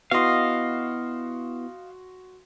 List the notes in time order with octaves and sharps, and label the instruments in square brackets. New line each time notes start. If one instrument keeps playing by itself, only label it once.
[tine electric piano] B3 E4 [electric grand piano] F#4 C6 [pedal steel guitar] D#5 F5